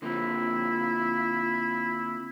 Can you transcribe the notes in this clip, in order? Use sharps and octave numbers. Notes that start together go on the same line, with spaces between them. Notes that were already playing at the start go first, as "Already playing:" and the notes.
D3 A#3 C4 E4 F4